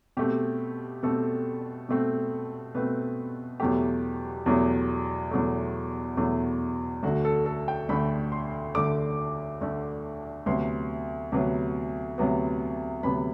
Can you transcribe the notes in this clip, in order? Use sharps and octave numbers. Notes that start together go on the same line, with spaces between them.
B2 A3 C4 G4
B2 A3 C4 A4
B2 A3 C4
B2 A3 C4 B4
E2 B2 F#3 A3 G4
E2 B2 F#3 A3
E2 B2 F#3 A3
E2 B2 F#3 A3
D2 D3 A3 F#4
A4
A4
G5
D2 D3 A3 B5
C6
D2 D3 A3 D6
D2 D3 A3
D2 C3 F#3 B3 C6
D2 C3 F#3 B3
D2 C3 F#3 B3
D2 C3 F#3 B3 B5